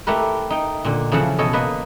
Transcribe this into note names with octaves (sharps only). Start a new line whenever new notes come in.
A3 E4 G4 A#4 B4
D#4 G5
A#2 D3
C#3 E3 F3 A4 F#5 A5
B2 A4 C#5 D#5
A#3 B4 D#5